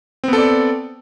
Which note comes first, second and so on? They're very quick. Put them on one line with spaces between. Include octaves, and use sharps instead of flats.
C4 B3 A4 D5